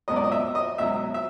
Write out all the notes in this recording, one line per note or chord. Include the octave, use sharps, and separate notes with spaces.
C#2 B2 F#3 D#5
D5
D#5
E5
D#5
C#2 B2 F#3 E5
E5